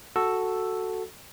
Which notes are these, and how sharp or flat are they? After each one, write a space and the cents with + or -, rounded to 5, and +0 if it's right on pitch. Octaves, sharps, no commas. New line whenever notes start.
F#4 +0 A4 +0 E6 +0